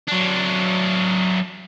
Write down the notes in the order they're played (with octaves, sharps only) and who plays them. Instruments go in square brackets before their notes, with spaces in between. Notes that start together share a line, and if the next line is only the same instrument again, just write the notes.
[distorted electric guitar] F#3 D4